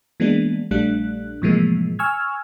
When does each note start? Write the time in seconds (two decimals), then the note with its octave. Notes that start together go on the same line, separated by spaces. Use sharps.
0.20 E3 G#3 A#3 B3 D4
0.71 A#1 G3 A3 D4 F#6
1.42 A2 C3 E3 F3 G#3 A#3
1.99 G#5 C#6 E6 F6 G#6